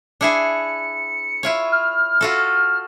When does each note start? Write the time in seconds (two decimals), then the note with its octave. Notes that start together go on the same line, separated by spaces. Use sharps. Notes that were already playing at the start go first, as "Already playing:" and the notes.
0.21 D4 E4 G#4 C#7
1.43 E4 F4 C#5
1.72 F6
2.21 F4 F#4 A4